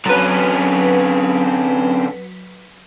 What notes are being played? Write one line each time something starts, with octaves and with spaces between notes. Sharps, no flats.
D3 F#3 C4 C#4 B4 A5